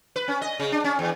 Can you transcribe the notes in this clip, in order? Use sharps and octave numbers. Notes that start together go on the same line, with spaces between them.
B4
C#4
D#5
C#3
D4
C#4
E2